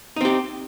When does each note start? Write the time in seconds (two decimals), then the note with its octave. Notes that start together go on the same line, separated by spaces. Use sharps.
0.16 D#4
0.21 C4
0.25 G4